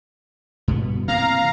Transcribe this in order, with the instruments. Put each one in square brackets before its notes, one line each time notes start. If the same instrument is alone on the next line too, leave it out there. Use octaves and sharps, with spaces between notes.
[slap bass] G2 B2 B3
[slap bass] C3 E3 A#3 [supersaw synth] F5 A#5